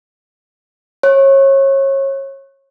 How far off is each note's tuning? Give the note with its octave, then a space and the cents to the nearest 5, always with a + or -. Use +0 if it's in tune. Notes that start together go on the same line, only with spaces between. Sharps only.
C#5 -30